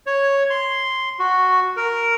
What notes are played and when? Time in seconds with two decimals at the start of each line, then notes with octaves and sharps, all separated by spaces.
0.07 C#5
0.50 C6
1.19 F#4
1.77 A#4